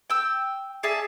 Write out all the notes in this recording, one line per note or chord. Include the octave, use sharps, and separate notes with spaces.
G5 E6
G#4 D5 E5 A5